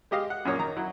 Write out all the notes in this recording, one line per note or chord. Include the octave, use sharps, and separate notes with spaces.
G#3 G4 D#5 F5
F#5
F#2 A#2 A#3 C#4 C#5 D#6
D#3 A#5
F#3 E4